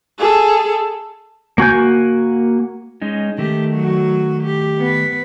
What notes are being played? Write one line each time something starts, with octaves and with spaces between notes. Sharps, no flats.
G#4 A4
A#3 F#4 G#5 G6
G#3 C#4 D#4
D#3 A3 G4
F#3 F#4
G4
B3 B4